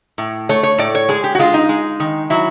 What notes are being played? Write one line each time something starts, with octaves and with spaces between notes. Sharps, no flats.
A2
A3 C#5
C#5
A2 D5
C#5
G#3 G#4
G4
F#4
G#3 F4
D#4
G#3
D#3
F#3 E4